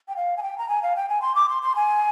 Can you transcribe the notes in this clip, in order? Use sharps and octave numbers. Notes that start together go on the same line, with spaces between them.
G5
F5
G#5
G5
A#5
G#5
F5
G5
G#5
C6
D6
C6
C6
G#5